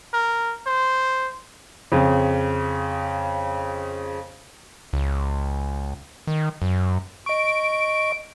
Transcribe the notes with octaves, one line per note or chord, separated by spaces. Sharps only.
A#4
C5
F2 C#3
C#2
D#3
F#2
D#5 C#6 D7